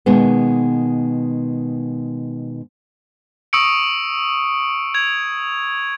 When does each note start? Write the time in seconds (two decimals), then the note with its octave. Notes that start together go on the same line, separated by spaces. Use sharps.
0.06 B2 D#3 G#3 A#3 B3
3.53 C#6 D#6 E6 C#7 D7
4.94 G#6 F7